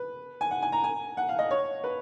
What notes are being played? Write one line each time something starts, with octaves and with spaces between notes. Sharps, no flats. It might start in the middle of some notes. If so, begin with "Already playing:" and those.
Already playing: B4
G#5
F#5
G#5
A#5
G#5
F#5
F5
D#5
C#5
B4